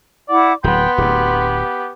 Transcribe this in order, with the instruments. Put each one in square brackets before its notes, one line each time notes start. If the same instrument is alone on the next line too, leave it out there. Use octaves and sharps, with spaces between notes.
[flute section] E4 F#5 D6 [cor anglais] D5
[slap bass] D1 F#3 [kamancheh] B3 [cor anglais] G5 [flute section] C6
[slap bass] D1 D2 [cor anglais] G4